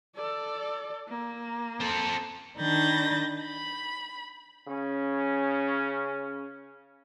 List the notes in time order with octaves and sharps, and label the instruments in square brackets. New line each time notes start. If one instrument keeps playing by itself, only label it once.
[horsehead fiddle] A4 D5
A#3
[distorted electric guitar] C4 A4
[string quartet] D#3 D4 B5 G6 A6 A#6
B5
[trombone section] C#3 C#4